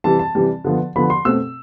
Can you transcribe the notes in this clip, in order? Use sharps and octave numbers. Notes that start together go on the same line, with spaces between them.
C3 E3 G3 A5
A5
C3 E3 G3
D3 F3 B3
D3 F3 B3 B5
C6
B2 A3 C4 E6